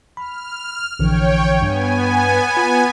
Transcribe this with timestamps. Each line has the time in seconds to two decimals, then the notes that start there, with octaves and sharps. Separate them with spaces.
0.17 B5 F6
0.99 A#1 D3 E3 C#5 G5
1.62 G2 B3 G#5
2.57 F4 B5